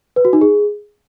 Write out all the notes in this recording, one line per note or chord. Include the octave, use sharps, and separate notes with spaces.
B4
F#4
D#4
G#4